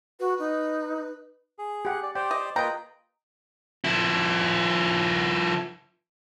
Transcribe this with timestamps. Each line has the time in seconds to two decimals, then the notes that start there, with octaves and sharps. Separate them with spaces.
0.20 F#4 B4
0.39 D#4
1.59 G#4
1.85 G4 F#5
2.03 D5
2.15 G4 C5 D5 G5
2.31 D#5
2.56 A#3 F4 B4 D#5 G5 A#5
3.84 F3 E4